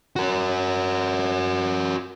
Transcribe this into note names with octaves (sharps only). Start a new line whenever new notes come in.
F#4 A#4